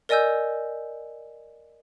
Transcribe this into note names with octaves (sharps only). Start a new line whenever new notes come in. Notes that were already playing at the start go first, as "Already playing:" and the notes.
A#4 D5 D#5 G#5 E6 G6